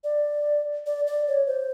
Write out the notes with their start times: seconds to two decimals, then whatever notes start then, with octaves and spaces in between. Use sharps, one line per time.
0.04 D5
0.86 D5
1.07 D5
1.28 C#5
1.47 C5